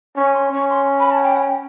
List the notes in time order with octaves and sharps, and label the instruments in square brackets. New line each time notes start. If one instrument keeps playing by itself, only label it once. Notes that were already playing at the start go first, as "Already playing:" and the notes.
[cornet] C#4 [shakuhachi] C#6
[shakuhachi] C6
[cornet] C#4 [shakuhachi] C#6
[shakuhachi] C6
B5
A5
F#5
G5
F#5
G5